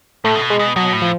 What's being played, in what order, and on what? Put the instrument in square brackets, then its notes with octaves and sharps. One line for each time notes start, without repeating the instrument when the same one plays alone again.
[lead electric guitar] A2 [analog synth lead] A3
[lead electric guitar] C#3
B2
[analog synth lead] G#3
[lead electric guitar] B2
[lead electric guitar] B2 [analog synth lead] F#3
[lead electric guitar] A2
[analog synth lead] F3